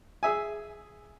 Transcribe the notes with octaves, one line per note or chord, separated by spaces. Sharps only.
G#4 E5 G#5